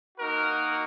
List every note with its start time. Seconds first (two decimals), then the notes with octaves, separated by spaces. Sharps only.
0.18 A#3 D#4 F#4 A#4